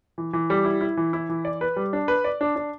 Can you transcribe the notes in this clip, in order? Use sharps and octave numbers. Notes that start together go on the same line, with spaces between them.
E3
E3
G3
E4
E4
E3
E4
E3
D5
B4
G3
D4
B4
D5
D4
D4